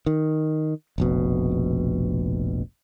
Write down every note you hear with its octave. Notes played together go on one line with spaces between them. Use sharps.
D#3
F1 A#1 B2